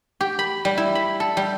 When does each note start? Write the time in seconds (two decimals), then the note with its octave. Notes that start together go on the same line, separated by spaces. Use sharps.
0.21 G4
0.39 B5
0.65 G3
0.78 E4
0.95 B5
1.20 A4
1.37 G3